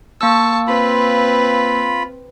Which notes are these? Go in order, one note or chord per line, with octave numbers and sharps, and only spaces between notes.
A#3 A5 C#6 E6
C4 F4 B4 B5